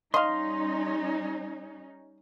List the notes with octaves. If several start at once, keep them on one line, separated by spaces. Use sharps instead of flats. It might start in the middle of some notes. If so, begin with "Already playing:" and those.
G3 C#4 D#4 D#5 F5 C6